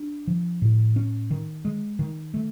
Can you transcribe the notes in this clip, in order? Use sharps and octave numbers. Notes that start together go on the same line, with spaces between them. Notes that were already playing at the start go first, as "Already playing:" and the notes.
Already playing: D4
F3
A2
C#4
D#3
G#3
D#3
A3